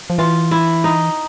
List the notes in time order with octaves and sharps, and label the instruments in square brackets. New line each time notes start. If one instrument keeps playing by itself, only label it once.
[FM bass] F3
[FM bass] E3 [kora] F4
[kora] E4
D#4